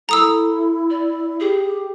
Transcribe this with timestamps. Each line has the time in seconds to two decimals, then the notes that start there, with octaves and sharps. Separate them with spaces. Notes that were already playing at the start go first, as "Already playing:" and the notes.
0.09 E4 A4 A#5 D#6 E6
0.90 D5
1.40 G4 G#4